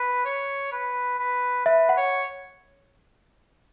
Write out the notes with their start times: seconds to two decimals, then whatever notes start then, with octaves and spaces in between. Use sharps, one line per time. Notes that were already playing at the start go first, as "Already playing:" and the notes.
Already playing: B4
0.25 C#5
0.72 B4
1.19 B4
1.65 B4 E5
1.89 F#5
1.97 C#5